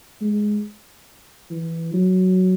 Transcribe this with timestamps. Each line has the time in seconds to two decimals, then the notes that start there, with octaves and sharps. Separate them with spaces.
0.21 G#3
1.50 E3
1.94 F#3